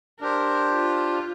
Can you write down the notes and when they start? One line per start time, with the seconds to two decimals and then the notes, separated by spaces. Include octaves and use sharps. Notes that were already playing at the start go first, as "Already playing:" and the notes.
0.21 D4 G4 A#4 C5
0.70 F4